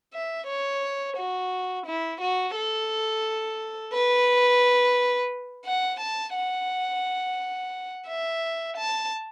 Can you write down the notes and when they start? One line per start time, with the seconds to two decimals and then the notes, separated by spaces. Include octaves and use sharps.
0.14 E5
0.47 C#5
1.17 F#4
1.87 E4
2.21 F#4
2.55 A4
3.93 B4
5.66 F#5
6.00 A5
6.35 F#5
8.08 E5
8.77 A5